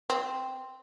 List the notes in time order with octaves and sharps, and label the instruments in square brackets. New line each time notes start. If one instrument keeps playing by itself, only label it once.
[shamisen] C4